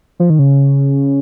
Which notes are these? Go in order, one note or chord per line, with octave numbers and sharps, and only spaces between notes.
F3
D#3
C#3